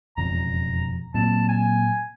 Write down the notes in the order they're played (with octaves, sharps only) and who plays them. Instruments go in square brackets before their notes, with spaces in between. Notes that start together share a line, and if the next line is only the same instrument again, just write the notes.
[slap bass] E1 F2 C#3 [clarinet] A#5
[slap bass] A#2 F#3 C4 [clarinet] A5
[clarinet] G#5